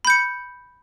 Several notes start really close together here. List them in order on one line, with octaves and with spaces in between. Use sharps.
B5 G6 C#7